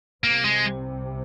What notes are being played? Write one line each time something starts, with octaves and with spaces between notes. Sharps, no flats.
C2 C3 G3 A#3 C4
G#3